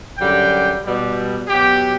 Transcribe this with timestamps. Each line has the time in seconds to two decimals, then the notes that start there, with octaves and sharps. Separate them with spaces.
0.18 F#2 D3 G3 G5
0.84 B2 G3
1.48 B2 F#3 G4